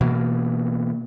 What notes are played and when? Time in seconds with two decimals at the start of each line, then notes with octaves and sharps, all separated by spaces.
0.01 B2 E3 A#3